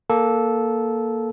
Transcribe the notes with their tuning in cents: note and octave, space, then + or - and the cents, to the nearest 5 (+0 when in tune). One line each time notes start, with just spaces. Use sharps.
A#3 +0 A4 -10